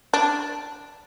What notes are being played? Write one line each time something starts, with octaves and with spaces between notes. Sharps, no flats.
D4